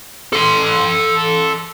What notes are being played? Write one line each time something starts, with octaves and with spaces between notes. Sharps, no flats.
A4 C6